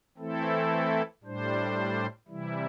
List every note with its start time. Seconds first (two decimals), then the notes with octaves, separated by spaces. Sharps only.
0.18 E3 A3 C4 E4 A4
1.24 A2 G3 D4 C5
2.28 C3 E3 G3 E4